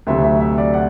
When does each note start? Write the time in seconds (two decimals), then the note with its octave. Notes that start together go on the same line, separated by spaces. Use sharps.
0.07 D2 C3 F#3 E5
0.24 E5
0.41 E5
0.58 D5
0.74 F#5